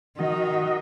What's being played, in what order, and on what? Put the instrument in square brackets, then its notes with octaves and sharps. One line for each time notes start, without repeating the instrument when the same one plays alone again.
[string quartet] D#3 [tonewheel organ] F#4 D#5